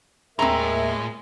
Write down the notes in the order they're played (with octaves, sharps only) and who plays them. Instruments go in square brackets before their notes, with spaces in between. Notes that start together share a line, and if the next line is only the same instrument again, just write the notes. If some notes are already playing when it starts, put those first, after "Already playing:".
[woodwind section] D#2 A#4 E5 [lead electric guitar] A2 [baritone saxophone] G#3 [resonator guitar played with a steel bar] C4 A#5